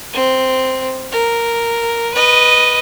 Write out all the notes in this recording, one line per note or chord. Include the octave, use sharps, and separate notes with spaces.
C4
A#4
B4 D#5